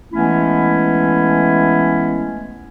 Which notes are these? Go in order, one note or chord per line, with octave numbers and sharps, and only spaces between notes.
E3 G#3 A3 B3 C#4 E4